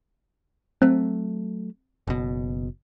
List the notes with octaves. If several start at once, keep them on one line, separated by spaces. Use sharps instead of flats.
F#3 A3 C4
F#1 B2